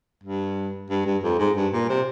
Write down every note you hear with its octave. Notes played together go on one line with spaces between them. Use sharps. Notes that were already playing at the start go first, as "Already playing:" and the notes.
G2
G2
G2
F2
G#2
G2
A#2
C3